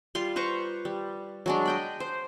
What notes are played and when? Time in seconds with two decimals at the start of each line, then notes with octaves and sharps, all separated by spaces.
0.15 G3 F4 C6
0.36 B4 C5 A#5 C#6
0.85 G3
1.46 F#3 G#3 D4
1.66 D#5 G5 B5
2.00 C5